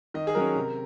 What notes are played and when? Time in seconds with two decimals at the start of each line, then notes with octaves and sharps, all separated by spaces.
0.14 D#3 D#5
0.27 G#4
0.35 F#3 C#4 A#4
0.55 C3